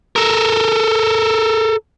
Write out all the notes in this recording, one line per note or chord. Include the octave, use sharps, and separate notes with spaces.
A4 A#4